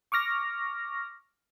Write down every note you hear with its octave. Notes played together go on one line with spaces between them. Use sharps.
C#6 D6 F6 A#6